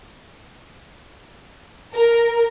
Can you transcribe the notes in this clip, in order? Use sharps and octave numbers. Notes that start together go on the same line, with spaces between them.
A#4